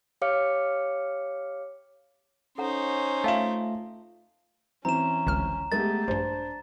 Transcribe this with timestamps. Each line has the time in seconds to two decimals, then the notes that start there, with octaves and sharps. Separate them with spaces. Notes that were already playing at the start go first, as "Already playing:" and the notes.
0.21 G4 C#5 F5 D6 F6 C#7
2.58 C#4 D#4 A4 C5 F#5 A#5
3.24 A3 F4 E5 F5 A5
4.85 E3 C4 C#4 A#5 E7
5.27 G1 C#2 F6
5.72 G#3 A3 B3 G4 A6
6.08 A#1 G2 D4 C5